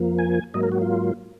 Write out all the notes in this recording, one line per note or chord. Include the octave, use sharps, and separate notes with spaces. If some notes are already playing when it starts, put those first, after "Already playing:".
Already playing: F2 F3 A#3
G#5
G#2 F#3 A#3 D#5
A#4
F#4
F4